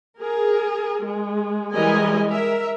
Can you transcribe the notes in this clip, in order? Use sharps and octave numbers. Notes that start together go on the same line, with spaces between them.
G#4 A#4
G#3
E3 G3 G#3 A#4 D#5 G#5
A#4 E5